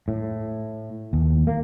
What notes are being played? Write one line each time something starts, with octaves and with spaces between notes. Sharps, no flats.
A2
D#2
A#3